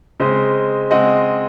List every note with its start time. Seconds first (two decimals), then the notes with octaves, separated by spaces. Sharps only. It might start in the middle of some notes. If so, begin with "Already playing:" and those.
0.20 C#3 G#3 C4 C5 D#5
0.91 C#3 G#3 C4 D#5 F#5